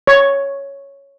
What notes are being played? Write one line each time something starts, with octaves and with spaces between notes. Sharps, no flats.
C#5